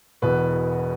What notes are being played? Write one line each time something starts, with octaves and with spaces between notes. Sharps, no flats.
E1 E2 B2 B4